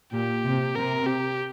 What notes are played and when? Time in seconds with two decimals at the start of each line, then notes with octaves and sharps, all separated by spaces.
0.12 A#2 G4
0.45 C3
0.75 C3 A#4
1.06 G4